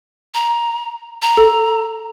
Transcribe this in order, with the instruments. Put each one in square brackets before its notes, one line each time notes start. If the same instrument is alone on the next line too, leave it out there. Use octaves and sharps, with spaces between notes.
[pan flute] A#5
A#5
[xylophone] A4